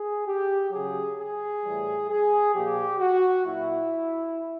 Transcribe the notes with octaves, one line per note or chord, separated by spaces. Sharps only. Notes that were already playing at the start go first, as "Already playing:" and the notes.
Already playing: G#4
G4
C#3 F#3 G#4
G#4
A2 E3 G3
G#4
A#2 F3 G4
F#4
A#2 F#3 E4